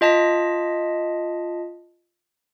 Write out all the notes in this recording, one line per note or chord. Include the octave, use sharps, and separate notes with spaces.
F4 D#5 A5 B6